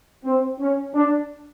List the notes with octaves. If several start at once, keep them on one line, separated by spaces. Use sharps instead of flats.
C4
C#4
D4